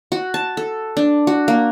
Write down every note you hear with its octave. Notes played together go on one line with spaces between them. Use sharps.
F#4
A5
A4
D4
F#4
A#3